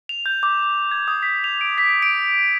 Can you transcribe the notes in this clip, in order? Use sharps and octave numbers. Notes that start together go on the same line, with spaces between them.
F7
G6
D6
D6
G#6
D#6
B6
F7
D7
B6
D7